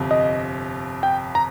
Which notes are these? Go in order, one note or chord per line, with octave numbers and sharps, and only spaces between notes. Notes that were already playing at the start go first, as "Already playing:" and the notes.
Already playing: G1 F2 C3
D#5
G5
A#5